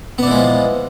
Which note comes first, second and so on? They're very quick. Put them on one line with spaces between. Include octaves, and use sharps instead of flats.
B3 D4 E3 G#3 F3